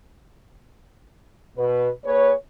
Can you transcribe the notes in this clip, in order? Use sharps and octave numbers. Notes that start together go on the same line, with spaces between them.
B2 B4
A#3 G#4 B4 C#5